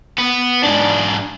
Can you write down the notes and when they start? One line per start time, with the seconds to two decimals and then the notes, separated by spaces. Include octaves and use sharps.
0.18 B3
0.63 G#2 D4